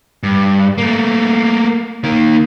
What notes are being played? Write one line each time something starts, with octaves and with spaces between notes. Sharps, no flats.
G2
A3 A#3
D#3 A#3